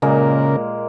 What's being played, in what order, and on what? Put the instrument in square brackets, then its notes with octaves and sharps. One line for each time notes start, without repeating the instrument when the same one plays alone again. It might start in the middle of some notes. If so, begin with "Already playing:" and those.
[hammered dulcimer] A#2 G#3 A#3 [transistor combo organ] C#3 A#4